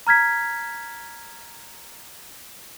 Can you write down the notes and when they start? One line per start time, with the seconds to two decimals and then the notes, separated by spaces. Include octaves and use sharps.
0.07 A#5 F6 G#6 B6